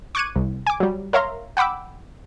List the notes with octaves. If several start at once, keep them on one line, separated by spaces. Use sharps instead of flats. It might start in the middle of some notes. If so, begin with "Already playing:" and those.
C#6 D6 F#6 G#6 C#7 D#7
C2
G#5 D6
F#3 G3
A#4 C#5 E5 F5 A#5 C6
F#5 G5 B5 D6 E6